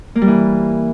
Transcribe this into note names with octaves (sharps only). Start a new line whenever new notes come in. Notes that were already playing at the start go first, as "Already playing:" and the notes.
A#3
G3
E3